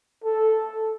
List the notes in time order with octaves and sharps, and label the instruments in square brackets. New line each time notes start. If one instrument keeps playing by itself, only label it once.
[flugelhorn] A4